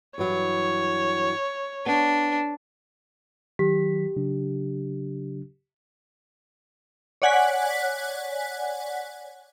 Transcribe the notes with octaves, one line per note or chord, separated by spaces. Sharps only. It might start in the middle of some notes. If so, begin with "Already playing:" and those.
G2 E3 F#3 C#5
B3 D4
D#3 F#3 G4 B6
C#3 F#3 D4
C#5 D5 F#5 G#5 F#6 B6